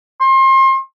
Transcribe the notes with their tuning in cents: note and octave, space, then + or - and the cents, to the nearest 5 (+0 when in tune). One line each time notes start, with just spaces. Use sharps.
C6 +35